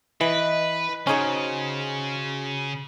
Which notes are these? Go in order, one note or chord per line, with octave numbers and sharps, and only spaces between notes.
E3 B4 D#5
C#3 C#4 D#4 F#4 G#4 C5